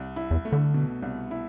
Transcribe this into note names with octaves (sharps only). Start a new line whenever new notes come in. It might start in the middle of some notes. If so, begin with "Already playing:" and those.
Already playing: C2
E4
E2
A3
D3
B2
C2
E4